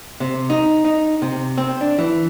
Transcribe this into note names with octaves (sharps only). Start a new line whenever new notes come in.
C3
D#4
D#4
C3
C4
D4
E3